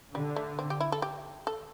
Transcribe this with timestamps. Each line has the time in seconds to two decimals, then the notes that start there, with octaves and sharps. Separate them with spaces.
0.15 D3 G3
0.36 A3
0.59 C4
0.70 G4
0.80 E4
0.92 A4
1.02 G4
1.47 A4